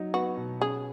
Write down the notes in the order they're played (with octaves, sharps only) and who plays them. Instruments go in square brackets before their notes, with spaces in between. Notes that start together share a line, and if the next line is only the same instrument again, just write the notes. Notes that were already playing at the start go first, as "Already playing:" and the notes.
Already playing: [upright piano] F#3 D#4
[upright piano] B3 [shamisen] F#4
[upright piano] B2
[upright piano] C#4 [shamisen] G#4